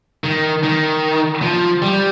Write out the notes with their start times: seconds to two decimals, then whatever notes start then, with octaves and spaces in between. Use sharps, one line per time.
0.24 D#3
0.64 D#3
1.42 F3
1.82 G3